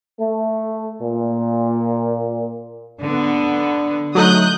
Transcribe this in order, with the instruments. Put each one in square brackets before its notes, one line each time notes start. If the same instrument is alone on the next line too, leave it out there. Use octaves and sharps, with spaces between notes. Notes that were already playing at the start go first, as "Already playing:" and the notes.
[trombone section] A3
A#2
[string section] D3 B3
[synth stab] F#3 A3 D#4 [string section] D#6 F#6 G6